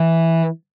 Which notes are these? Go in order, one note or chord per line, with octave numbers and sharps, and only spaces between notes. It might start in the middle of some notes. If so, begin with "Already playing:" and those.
Already playing: E3